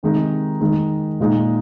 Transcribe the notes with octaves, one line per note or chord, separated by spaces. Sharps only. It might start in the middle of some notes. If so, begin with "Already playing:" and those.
C3 D#3 G#3 D#4
D#3 G#3 D#4
A#2 G#3 D#4